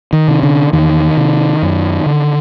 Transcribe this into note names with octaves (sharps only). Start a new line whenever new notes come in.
D#3
C3
D3
E2 D#3
C3
F#2
D3